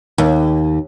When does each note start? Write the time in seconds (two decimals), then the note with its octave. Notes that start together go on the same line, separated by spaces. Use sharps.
0.18 D#2